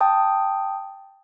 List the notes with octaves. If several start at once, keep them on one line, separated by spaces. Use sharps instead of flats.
G5 A5 D#6